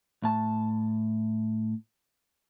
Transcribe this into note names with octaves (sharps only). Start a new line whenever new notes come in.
A2 A5